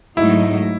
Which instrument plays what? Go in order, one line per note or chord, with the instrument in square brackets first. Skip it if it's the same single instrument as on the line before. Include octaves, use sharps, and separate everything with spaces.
[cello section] G#2 F#3 A3 D#4 [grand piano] E4